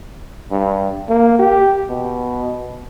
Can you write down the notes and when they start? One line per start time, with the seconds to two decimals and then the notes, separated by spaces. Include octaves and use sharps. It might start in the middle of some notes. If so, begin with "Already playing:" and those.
0.51 G2
1.09 A#3
1.39 G4
1.90 B2